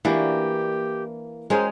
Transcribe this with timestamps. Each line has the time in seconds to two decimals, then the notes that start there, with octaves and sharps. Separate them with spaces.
0.05 E3 A#3 D4 F#4 G4
1.50 G#3 C#4 G#4 A#4 C5